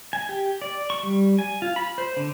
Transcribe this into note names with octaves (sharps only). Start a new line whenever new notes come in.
G#5
G4
D5
C#6
G3
G#5
F4
B5
C5
D3